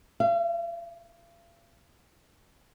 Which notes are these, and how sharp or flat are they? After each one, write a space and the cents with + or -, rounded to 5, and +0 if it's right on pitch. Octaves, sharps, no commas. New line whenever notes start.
F5 -45